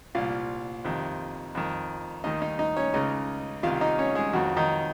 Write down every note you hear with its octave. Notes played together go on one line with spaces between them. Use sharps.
C2 A#2 F4 F5
F2 C3 D#3
F2 D#3
D#2 D#3 D#4 D#5
D#4 D#5
D#4 D#5
C#4 C#5
C#2 C#3 D#4 D#5
C2 C3 D#3 F4 F5
D#4 D#5
C#4 C#5
G#3 G#4
F2 D#3 F#3 F#4
D#3 D#4